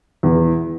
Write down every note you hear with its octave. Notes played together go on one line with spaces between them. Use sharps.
E2